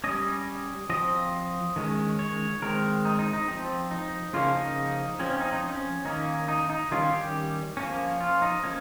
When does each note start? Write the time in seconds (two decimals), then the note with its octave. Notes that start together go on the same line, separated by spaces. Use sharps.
0.04 G3 C#4 D#5
0.90 F3 C4 D#5
1.76 D#3 G#3 C#4
2.19 C#5
2.62 D#3 G#3 C4 A#4
3.05 D#4
3.19 D#4
3.33 D#4
3.48 F3 C4
3.91 D#4
4.34 C#3 F3 A#3 C#4 F4
4.55 D#4
5.19 F3 C4 C#4
5.30 C#4
5.41 D#4
5.52 D#4
5.62 C#4
6.05 D#3 A#3 C#4 D#4
6.48 D#4
6.70 D#4
6.91 D#3 G3 C#4 F4
7.13 G4
7.77 F3 A#3 C#4
8.20 F4
8.42 D#4
8.63 F3 A#3 C#4